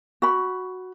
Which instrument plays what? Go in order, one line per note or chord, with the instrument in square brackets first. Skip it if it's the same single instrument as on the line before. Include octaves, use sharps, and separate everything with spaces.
[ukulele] F#4 B5